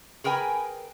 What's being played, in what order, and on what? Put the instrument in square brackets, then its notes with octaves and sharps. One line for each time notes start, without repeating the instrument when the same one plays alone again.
[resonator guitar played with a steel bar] G#4 A#4 B4 G5 G#5